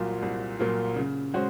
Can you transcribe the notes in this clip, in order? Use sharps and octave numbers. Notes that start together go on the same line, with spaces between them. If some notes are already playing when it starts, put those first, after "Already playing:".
Already playing: C2 A#2 F#3 A#3 F4
C2
A#2 F#3 A#3 F4
C#3
G#3 C#4 F#4 C5